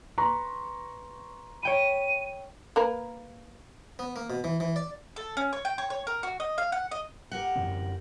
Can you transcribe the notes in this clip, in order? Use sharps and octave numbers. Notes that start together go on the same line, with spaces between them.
B4 A#5 C6 C#6
C#5 G5 B5 D#7
A#3 A#4 B4
B3
A#3
B2
E3
E3
D5
A4
C#4
C#5
G5
C#5
C#5
A#4
F#4
D#5
F5
F#5
D#5
G4 A#4 F#5
F#2 D3 C4